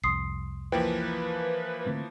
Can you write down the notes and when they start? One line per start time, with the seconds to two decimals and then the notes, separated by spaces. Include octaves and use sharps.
0.04 C2 F2 C6 D#6 C7
0.72 E3 F3 A#3 B4 G5
1.86 D3 A3 C4